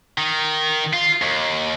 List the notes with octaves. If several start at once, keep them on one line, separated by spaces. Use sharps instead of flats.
D#3
F4
D#2